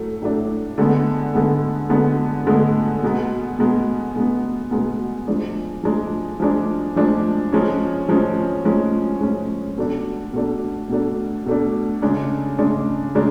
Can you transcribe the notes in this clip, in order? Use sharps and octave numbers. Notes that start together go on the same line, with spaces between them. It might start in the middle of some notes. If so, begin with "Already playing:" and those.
Already playing: A2 F#3 A3
A2 F#3 A3 D4
D3 G#3 B3
D3 G#3 B3
D3 G#3 B3
D3 G#3 B3
B2 G#3 B3
B2 G#3 B3
B2 G#3 B3
B2 G#3 B3
F3 G#3 D4
F3 G#3 D4
F3 G#3 D4
F3 G#3 D4
F3 G#3 C#4
F3 G#3 C#4
F3 G#3 C#4
F3 G#3 C#4
B2 A3 D4
B2 A3 D4
B2 A3 D4
B2 A3 D4
C#3 G#3 D4
C#3 G#3 D4
C#3 G#3 D4